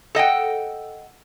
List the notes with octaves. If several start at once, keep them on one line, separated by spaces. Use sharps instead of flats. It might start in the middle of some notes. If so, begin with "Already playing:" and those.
A4 D#5 F#5 G5